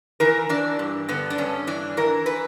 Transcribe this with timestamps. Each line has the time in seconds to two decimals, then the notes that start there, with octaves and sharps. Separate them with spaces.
0.20 E3 A#4
0.49 E3 D4
0.79 G2
1.09 D3 B3
1.30 D4
1.38 G2 C#4
1.67 E3 D4
1.97 E3 A#4
2.26 B4